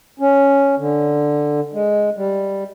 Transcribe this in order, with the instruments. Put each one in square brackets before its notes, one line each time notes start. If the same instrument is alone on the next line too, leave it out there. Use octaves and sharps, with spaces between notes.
[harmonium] C#4
D3
G#3
G3